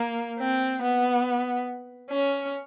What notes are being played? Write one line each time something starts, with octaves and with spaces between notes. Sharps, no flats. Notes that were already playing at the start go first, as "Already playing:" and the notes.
Already playing: A#3
C4
B3
C#4